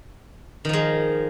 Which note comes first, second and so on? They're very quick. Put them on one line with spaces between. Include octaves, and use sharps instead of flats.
D#3 F3 G#3